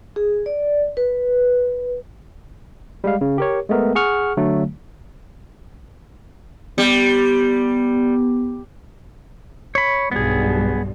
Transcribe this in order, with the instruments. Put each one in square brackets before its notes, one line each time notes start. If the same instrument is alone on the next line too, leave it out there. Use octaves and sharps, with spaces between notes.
[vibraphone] G#4
D5
B4
[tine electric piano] G3 G#3 F5
C#3
G4 A#4 C#5
G#3 A3 B3 A#4
G#4 F#5 C#6 F6
D3 F#3 A3
[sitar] G3 [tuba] B3
[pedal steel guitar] C#5 B5
[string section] B1 G2 [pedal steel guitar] B3 G#4